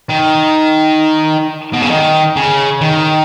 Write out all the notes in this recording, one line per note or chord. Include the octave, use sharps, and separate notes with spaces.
D#3
B2
C#3
D#3
C#3
D#3